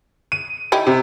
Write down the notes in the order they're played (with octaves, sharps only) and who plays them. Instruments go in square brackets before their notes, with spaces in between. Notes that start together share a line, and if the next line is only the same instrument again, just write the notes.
[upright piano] D#7
[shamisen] D#4 E4 G4
[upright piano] C3